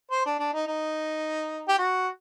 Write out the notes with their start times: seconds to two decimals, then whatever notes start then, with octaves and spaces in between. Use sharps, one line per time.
0.11 C5
0.25 D4
0.39 D4
0.53 D#4
0.67 D#4
1.68 G4
1.79 F#4